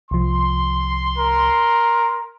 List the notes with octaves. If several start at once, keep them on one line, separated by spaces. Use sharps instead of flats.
C2 F3 C6
A#4